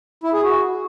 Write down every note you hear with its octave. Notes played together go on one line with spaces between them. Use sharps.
E4
G#4
F#4